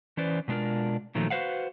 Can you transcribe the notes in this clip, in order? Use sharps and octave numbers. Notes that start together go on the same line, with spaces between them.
E3 C#4 B4 C5 D5
B2 G#3 D4 F4 A#4
A#2 D#3 F3 F#3 A3
F#4 B4 C5 F5 F#5